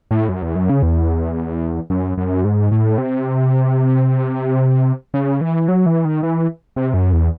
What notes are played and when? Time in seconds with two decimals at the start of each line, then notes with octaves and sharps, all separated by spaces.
0.11 A2
0.29 F#2
0.42 E2
0.55 F#2
0.69 C#3
0.83 E2
1.90 F#2
2.18 F#2
2.44 G#2
2.72 A2
2.98 C3
5.14 C#3
5.41 E3
5.68 F#3
5.86 E3
6.05 D#3
6.23 E3
6.76 C3
6.94 F#2
7.13 E2